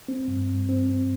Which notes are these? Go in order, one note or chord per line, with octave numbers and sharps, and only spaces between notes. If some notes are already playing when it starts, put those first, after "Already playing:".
C4
G2
G2
C4
C4